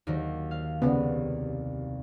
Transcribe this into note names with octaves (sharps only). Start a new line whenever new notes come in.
D#2 D#3 F#3
F5
C2 C#3 B3